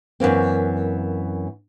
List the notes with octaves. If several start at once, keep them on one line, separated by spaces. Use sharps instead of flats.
F#2 E3 A#3 C4